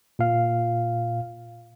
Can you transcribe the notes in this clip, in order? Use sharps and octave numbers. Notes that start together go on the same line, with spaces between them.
A#2 F5